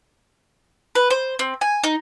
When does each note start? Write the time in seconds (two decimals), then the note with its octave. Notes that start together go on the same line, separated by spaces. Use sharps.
0.95 B4
1.10 C5
1.39 C4
1.61 G#5
1.83 D#4